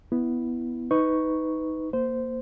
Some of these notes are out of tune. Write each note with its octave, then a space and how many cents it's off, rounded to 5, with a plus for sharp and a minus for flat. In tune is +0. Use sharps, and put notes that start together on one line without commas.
B3 +0 E4 +0
D#4 +15 B4 +20 C#6 +0
A#3 +0 C5 -15